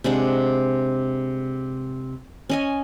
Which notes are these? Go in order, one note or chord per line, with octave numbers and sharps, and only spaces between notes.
C3 G#3 D4 F#5
C#4 D#5 G#5